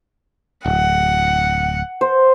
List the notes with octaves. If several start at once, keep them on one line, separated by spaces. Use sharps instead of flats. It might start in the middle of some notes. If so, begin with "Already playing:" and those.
D1 F#5
C5